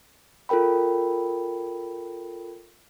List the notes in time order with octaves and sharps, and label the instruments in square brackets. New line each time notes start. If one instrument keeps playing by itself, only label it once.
[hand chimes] F4 A4 A#4 G5 B5